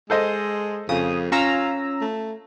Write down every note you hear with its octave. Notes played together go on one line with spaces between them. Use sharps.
G#3 A4 C5 D#5
F2 C#3 D#6
C#4 F4 A#5 E6
A3